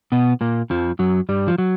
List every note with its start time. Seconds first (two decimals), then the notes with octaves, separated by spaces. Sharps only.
0.12 B2 B3
0.41 A#2 A#3
0.70 F2 F3
0.99 F#2 F#3
1.29 G2 G3
1.48 F3
1.58 F#3